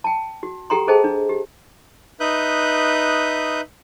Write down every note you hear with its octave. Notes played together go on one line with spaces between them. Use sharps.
G5 A5
F#4
G4 A4 F#5 G5 A#5 C6
G#4 A4 C5 D#5 G5 A5
D4
G4
D#4 B4 E5 D#6 F#6 G6